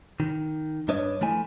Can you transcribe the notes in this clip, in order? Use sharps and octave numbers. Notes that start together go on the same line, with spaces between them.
D#3
G2 G3 D4 B4 C#5 D#5
F3 A3 E4 G#5